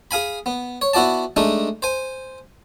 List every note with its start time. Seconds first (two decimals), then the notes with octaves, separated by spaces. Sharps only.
0.11 G#4 F5 G#5 B5
0.46 B3
0.82 C#5
0.94 B3 E4 F#4 D5 A5
1.36 G#3 A3 D4 D#4
1.82 C5 G#5